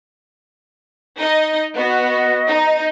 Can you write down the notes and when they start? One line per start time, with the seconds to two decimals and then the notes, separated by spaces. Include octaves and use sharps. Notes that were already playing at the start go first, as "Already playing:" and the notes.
1.19 D#4 D#5
1.76 B3 F#4 D#5
2.47 D#4